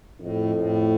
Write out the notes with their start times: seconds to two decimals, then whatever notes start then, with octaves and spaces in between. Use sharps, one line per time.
0.20 F2 A2
0.55 A2